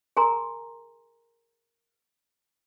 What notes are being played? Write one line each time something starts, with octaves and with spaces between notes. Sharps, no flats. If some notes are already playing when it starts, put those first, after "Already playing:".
G#4 A#4 G#5 A#5 C6